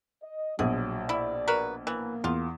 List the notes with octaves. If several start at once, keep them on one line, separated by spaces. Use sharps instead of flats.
D#5
A#1 B2 F#3 G#4
E4 D5
F#4 A#4 B4
E3 A#3
E2 F4